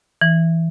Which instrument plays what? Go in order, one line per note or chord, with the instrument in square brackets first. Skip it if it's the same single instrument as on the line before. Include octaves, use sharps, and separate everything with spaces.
[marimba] E3